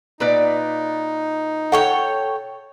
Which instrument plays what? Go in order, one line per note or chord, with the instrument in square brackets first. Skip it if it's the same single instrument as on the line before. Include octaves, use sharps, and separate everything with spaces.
[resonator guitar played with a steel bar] A#2 B4 D5 [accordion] D#4
[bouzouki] A4 C#5 G5 [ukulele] F#5